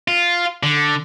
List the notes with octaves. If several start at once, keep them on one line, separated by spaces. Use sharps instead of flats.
F4
D3